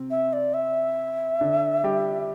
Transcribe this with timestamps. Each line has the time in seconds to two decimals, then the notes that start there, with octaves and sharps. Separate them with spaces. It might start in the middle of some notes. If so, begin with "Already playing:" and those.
Already playing: C3 C4
0.11 E5
0.33 D5
0.54 E5
1.41 D3 D4
1.84 G3 G4